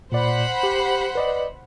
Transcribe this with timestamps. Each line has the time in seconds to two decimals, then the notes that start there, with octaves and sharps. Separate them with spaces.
0.12 A#2 C5 D5 F#5 B5
0.63 G4
1.15 B4 D5 D#5